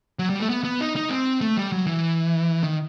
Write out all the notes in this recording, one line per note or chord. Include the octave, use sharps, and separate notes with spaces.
F#3
G3
A3
B3
B3
D#4
D#4
C4
A3
G3
F#3
E3
D#3